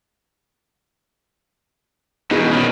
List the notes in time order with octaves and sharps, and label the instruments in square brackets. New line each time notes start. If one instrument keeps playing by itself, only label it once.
[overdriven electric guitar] E2 B2 [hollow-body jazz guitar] D#4 G#4 A#4
[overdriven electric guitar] B2 D#3 [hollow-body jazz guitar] A#3 C#4